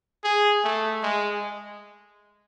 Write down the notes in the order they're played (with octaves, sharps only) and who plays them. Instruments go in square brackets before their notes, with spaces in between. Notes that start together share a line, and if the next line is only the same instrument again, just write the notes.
[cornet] G#4
A3
G#3